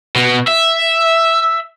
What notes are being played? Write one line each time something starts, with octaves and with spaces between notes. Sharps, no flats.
B2
E5